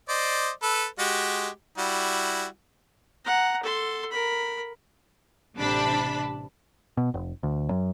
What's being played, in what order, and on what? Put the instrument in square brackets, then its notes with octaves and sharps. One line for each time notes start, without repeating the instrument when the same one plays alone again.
[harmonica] C5 D5 D#5
A4 B4
G#3 F#4 G4
G3 E4 F#4
[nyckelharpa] F#5 A#5
A4 C6
A#4 B5
[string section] A1 C3 D4 A5 B5
[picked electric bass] B2
F1
D2
F#2